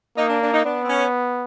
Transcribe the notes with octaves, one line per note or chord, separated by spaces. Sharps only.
A#3 D#4
D4
D4
D#4
B3 D4
C4
C#4